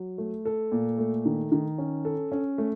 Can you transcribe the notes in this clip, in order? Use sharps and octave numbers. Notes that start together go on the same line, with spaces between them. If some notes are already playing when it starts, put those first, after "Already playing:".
Already playing: F#3
A3
A4
A#2
A3
D#3
D#3
C#4
A4
C#4
A3